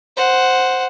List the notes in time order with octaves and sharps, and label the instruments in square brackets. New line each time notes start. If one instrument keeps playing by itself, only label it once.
[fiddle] C5 F#5